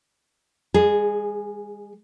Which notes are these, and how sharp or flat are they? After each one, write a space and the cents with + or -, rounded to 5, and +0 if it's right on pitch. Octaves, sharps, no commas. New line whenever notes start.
G#3 -40 G#4 +0